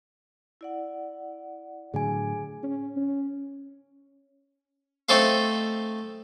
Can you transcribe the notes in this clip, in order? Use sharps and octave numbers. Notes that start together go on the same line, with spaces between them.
E4 D5 F#5
A2 D3 F#3 G#4 G#5
C#4
C#4
A3 C4 D#4 A4 C5 F5